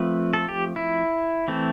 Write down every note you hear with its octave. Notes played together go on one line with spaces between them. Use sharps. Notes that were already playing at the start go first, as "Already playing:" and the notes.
Already playing: F3 A3 C4 B4
A4
G4
E4
E3 A3 C4